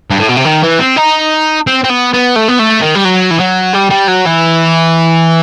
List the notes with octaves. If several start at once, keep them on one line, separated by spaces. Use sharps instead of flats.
G2
A2
B2
C3
D#3
E3
C4
D#4
C4
C4
B3
B3
A3
B3
A3
D#3
G3
F#3
E3
F#3
G3
G3
F#3
E3